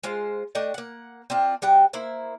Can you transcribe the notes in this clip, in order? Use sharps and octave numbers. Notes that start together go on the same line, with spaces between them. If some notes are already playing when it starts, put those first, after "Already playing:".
G#3 F4 C5
A3 D4 D#5 G5
A#3 F#5
C4 D4 F4
G3 F#4 G5
A#3 E4 C5